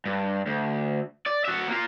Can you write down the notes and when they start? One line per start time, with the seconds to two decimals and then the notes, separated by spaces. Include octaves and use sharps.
0.05 G2
0.46 D2
1.26 D5
1.45 F#4 E5
1.68 A#3 F4